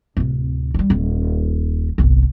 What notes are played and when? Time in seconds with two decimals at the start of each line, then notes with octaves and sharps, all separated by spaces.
0.17 D1 C3
0.74 F#3 G3
0.90 D#1
1.98 G1 C2